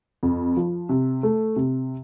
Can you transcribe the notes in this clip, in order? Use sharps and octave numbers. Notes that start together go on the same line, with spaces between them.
F2
F3
C3
A3
C3